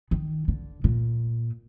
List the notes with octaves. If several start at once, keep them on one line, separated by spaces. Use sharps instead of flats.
D#3
D3
A#2